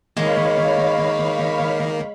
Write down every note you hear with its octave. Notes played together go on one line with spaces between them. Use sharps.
D#3 G#3 A#3 C#5 F5 B5